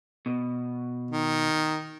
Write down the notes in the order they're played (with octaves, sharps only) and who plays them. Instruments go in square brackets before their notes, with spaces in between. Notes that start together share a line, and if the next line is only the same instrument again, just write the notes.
[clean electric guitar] B2
[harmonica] D#3